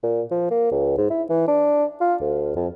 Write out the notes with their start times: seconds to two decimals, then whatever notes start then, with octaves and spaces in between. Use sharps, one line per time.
0.03 A#2
0.31 F3
0.51 A#3
0.72 C#2
0.98 G#2
1.10 E4
1.30 E3
1.48 D4
2.01 F4
2.21 D2
2.56 F2